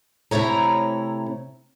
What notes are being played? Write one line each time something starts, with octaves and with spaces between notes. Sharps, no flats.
C3 A3 E4 C#5 A#5